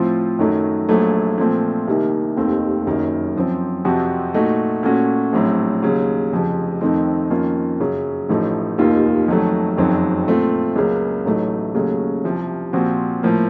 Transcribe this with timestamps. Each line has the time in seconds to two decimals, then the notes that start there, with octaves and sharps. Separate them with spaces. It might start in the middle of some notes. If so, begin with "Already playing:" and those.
Already playing: A2 F3 C4 F4
0.39 F#2 D#3 F#3 A3
0.89 A#1 A#2 F#3 A3
1.38 A#2 F3 A3 C4
1.88 C2 C3 D#3 A#3
2.37 F1 D#2 D#3 A3 C4
2.86 F#1 F#2 D#3 F#3 A#3
3.36 F#2 F3 C4
3.85 F2 C3 F3 C4 F#4
4.34 A#2 A3 D#4 F#4
4.83 A#2 A3 C#4 F#4
5.33 A#1 A2 F#3 C4
5.82 D#2 C#3 F#3
6.32 F1 F2 C#3 F3
6.81 F2 D#3 A3 C4 D#4
7.30 F2 D#3 A#3 C#4 F4
7.80 F#2 C#3 F#3
8.29 A1 A2 F3 A3 D#4
8.78 F1 D#2 D#3 A#3 F4
9.28 F2 D#3 F#3 A3
9.77 F#1 F2 D#3 F#3 C4
10.27 A#2 A3 C4 F4
10.76 C#2 C#3 F#3 A#3
11.25 A1 A2 F#3 A3 D#4
11.74 D#2 C#3 F#3 A3 C#4
12.24 C2 C3 F3
12.73 A#2 F3 C4 F#4
13.23 A2 F3 A#3